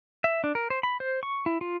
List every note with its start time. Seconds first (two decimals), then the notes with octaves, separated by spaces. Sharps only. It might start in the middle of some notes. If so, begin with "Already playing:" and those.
0.24 E5
0.44 D4
0.55 A#4
0.70 C5
0.83 B5
1.00 C5
1.23 C#6
1.46 E4
1.61 F4